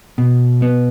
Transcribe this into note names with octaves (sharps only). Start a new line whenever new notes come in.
B2
B3